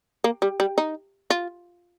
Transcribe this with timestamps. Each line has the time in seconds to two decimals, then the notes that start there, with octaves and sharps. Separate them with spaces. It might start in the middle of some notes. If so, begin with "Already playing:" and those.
0.24 A#3
0.42 G3
0.60 G3
0.78 D#4
1.30 F4